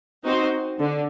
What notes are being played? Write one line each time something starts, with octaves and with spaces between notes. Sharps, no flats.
C4 D#4 F#4 C5
D3